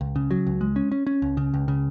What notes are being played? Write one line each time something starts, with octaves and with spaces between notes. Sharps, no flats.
C#2
C#3
F#3
C#2
G#3
C#4
C#4
C#4
C#2
C#3
C#2
C#3